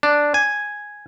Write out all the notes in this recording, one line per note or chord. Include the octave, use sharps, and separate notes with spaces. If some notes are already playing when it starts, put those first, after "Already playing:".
D4
G#5